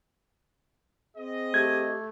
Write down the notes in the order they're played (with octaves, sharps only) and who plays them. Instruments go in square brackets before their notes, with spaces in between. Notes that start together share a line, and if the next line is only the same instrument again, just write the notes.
[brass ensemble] C4 G#4 D#5
[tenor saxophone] A3 [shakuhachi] G4 [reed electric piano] G#6